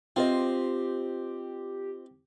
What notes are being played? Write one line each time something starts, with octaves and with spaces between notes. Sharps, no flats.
C4 F4 G4 C5 D#5